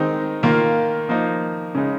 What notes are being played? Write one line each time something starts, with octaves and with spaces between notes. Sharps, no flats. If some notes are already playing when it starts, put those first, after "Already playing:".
Already playing: D#3 G#3 C4 D#4
D#3 A#3 F4
F3 A#3 D#4
C#3 G#3 D#4